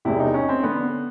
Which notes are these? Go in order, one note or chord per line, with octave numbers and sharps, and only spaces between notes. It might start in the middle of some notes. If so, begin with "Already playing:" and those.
E1 E2 C3 E4
D#4
C#4
C4
D3 B3